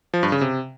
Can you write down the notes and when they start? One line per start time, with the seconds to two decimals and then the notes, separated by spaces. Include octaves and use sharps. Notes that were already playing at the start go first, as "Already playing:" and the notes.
0.14 F3
0.23 G2
0.32 C#3
0.41 C3